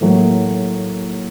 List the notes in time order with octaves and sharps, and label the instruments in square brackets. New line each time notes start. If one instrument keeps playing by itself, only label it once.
[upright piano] A2 F#3 A#3